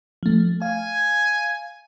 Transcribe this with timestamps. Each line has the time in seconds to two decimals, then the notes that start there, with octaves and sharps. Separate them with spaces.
0.23 F3 A3
0.62 F5 G#5